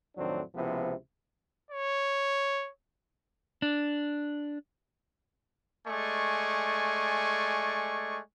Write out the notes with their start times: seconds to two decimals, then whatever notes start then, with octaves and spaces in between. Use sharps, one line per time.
0.17 F2 A2 D#3 F#3 C4 D4
0.55 C#2 C3 F3 B3 E4 C5
1.71 C#5
3.62 D4
5.88 G#3 A3 D5 G#5 C#6